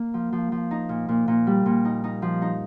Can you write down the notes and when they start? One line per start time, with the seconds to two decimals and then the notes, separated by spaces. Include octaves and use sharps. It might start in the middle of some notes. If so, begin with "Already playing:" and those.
Already playing: A#3
0.14 F3
0.33 F3
0.52 F3
0.71 D#4
0.89 A#2
1.09 A#2
1.28 A#2
1.47 G3
1.66 A#2
1.85 D#4
2.04 D#4
2.22 F3
2.42 D#4